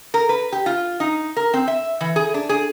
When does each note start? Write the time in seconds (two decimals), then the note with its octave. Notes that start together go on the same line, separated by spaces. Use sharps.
0.14 A#4
0.29 B4
0.52 G4
0.66 F4
1.00 D#4
1.37 A#4
1.54 C4
1.68 E5
2.01 E3
2.16 G#4
2.34 D4
2.49 G#4